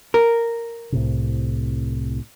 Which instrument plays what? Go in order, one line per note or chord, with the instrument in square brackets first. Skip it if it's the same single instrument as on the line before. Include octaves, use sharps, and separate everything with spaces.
[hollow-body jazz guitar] A#4
[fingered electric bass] C2 A2 C3